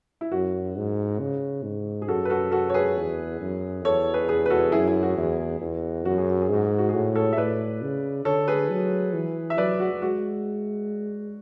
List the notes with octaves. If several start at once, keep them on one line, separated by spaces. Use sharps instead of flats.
E4
F#2 F#4
G#2
C#3
G#2
G#4
F#2 F#4 A4
B4
F#4 A4
F#4 A4
C#5
G#4 B4
E2
F#2
E2 A4 C#5
G#4 B4
G#4 B4
B4
F#4 A4
F#2 E4 G#4
E4
F#4
E2
E2
F#2 F#4
G#4
F#4
G#4
G#2 F#4
G#4
F#4
G#4
A2 F#4
A4 C#5
E5
A2 B4 D5
C#3
D3 A4 C#5
G#4 B4
F#3
E3
E5
F#3 B4 D5
F#4
G#3 F#4